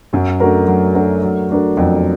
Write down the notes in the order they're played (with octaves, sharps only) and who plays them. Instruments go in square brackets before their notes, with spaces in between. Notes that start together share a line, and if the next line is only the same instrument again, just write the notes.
[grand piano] F#2 [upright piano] F#3
[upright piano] A3 D4 F#4 A#4
F#3
A3 D4 F#4 A#4
F#3
A3 D4 F#4 A#4
[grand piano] F2 [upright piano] F#3